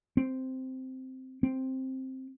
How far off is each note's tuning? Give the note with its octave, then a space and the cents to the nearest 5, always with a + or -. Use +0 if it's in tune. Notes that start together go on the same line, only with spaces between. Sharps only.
C4 -5
C4 +5